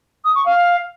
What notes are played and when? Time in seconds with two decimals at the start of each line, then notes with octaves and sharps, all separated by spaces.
0.25 D#6
0.35 C#6
0.46 F5